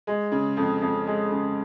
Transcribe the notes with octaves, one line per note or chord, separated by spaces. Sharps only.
G#3
C#3
F2
F2
G#3
C#3